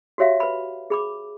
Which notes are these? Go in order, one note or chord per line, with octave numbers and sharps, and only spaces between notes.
F#4 G4 C#5 E5 F5
B4 B5
G#4 B5 D6